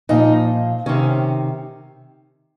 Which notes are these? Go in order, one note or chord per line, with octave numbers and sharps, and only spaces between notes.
A#2 F3 D#4
C3 D#3 C#4